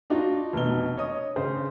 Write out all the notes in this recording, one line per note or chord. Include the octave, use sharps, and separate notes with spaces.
D4 D#4 F4 F#4
F1 B2 G7
C#5 D#5 D#6
C#3 C5